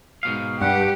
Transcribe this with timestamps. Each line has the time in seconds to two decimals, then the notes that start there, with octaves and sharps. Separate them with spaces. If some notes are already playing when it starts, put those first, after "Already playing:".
0.23 G#2 B2 F5
0.61 G2 G4 F#5